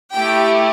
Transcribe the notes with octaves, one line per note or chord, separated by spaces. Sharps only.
A3 E4 G4 G5